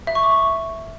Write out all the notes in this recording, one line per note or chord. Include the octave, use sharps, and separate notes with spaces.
E5
C#6
D6
C#6